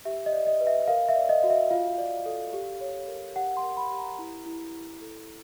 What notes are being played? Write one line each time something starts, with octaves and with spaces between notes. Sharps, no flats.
G4 E5
D#5
D5
D#5
B4
E5
A#4 F5
E5
D5
D#5
F#4
E5
F4 F5
D5
A4
G4
C#5
A#4
G4 F#5
C6
A#4
B5
G4
A#5
E4
E4
E4
A4